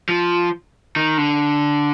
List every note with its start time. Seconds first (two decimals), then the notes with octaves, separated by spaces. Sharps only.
0.09 F3
0.96 D#3
1.18 D3